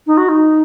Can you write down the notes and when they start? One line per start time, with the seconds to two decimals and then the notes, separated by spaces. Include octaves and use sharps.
0.06 D#4
0.17 F#4
0.28 D#4